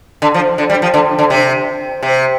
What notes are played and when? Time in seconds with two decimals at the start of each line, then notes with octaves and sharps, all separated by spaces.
0.22 D3
0.34 F3
0.58 D3
0.70 G3
0.82 F3
0.94 D3
1.19 D3
1.30 C3
2.03 C3